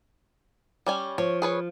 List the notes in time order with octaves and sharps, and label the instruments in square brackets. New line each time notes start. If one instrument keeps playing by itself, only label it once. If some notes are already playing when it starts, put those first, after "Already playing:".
[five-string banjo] G3 C#4 G#5
[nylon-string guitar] F3 [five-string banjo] C#5
[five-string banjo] G#4 B4 C#5